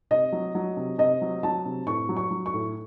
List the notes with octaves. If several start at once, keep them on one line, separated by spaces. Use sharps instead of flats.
C3 D#5
F#3
F#3
C3
C3 D#5
F#3
F#3 A5
C3
A2 C#6
F#3
C#6
F#3
C#6
A2